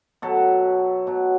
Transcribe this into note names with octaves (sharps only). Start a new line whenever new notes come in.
B2 F#3 A4
B2 F#3